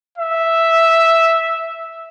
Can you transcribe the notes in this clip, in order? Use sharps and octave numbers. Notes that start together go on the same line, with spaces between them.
E5